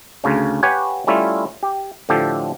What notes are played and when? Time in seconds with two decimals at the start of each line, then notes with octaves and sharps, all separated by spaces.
0.24 D2 C#3 C#4
0.63 G4 B4 C#5 F#5 G#5
1.07 G3 A3 C#4 E4 F4
1.63 G4
2.09 A2 D3 F3 G4 A4